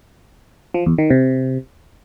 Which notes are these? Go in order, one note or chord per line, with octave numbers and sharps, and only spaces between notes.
F3
E2
D#3
C3